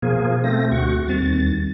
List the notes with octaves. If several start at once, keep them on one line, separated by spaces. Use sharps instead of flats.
B2 F3 A#3 G#4
A3 C4 A#6
D2 F#4 C#6
D#2 G3 C4 A6